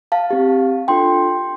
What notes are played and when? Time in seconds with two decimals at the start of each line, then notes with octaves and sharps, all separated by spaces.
0.12 F5 A5
0.31 C4 G4
0.88 D4 F4 A4 G5 C6